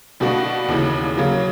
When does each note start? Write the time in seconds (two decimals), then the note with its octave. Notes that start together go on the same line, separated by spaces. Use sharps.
0.20 B2 G3 A#3 D4 F#4
0.68 D#2 C#3 E3
1.17 C#3 F#3 A#3